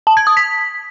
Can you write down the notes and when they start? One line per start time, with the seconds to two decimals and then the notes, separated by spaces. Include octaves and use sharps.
0.07 A5
0.17 G#6
0.27 D#6
0.37 B6